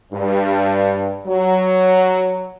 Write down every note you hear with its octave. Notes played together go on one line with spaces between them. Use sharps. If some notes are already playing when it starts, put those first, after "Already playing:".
G2
F#3